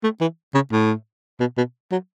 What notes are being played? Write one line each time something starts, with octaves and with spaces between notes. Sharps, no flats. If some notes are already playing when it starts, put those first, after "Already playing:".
A3
E3
C#3
A2
B2
B2
F#3